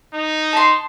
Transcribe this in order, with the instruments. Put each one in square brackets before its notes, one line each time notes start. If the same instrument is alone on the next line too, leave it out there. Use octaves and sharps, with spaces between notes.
[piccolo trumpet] D#4
[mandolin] A5 B5 C6